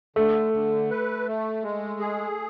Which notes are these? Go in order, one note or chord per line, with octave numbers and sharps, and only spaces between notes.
D3 A3
D3
B4
A3
G#3
G#4